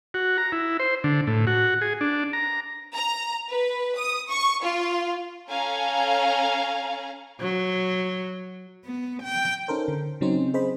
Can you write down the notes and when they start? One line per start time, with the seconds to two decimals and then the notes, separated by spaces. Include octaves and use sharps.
0.14 F#4
0.38 A#5
0.52 E4
0.80 C5
1.04 D3
1.27 A2
1.47 F#4
1.81 G#4
2.01 D4
2.33 A#5
2.93 A#5
3.49 B4
3.98 D#6
4.29 C#6
4.63 F4
5.48 C#4 A4 F5 G#5 A#5
7.40 F#3
8.84 B3
9.23 G5
9.68 C#4 D#4 A4 A#4 C5
9.88 D3
10.21 C#3 F#3 C4 C#4 D#4 C5
10.54 G#4 C5 D#5 B5